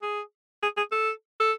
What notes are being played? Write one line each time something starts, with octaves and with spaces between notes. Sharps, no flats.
G#4
G#4
G#4
A4
A4